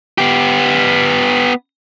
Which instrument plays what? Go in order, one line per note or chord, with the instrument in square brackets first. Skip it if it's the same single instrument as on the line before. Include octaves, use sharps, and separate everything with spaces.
[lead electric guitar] B3 G4